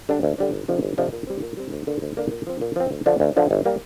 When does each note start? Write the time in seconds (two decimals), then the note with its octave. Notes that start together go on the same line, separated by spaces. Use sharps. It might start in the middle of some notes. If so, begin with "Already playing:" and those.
0.09 D3 G3 D4
0.23 D2
0.38 D3 G3 D4
0.53 G1
0.68 F2 C3 F3 D4
0.83 G1
0.98 F2 C3 F3 D4
1.13 A#2
1.27 G3 C4
1.42 A#2
1.57 G3 C4
1.72 D2
1.87 D3 A#3 D4
2.02 D2
2.17 D3 A#3 D4
2.31 A#2
2.47 F3 C4
2.61 A#2
2.76 F3 C4
2.91 D2
3.06 D3 F3 D4
3.20 D2
3.36 D3 F3 D4
3.51 G1
3.65 G3 A#3